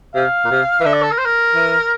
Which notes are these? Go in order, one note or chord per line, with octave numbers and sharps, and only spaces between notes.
C3 F5
A#2
C3
E3
D3 E5
D5
A4
A#4
C5
A#4
E3